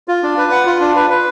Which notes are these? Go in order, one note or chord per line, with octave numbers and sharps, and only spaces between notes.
F4
D4
B4
F#5
F4
D4
B4
B4